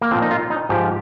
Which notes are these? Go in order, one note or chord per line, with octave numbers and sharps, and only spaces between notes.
A#3
A#2 F3 C4
D#4
F4
D#4
G#2 F3 G4